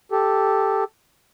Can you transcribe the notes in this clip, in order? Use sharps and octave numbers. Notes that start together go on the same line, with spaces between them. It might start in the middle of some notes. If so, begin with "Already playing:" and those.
G4 A4